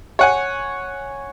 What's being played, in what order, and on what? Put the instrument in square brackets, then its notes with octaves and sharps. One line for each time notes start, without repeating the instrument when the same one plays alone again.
[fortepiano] C#5 F#5 G#5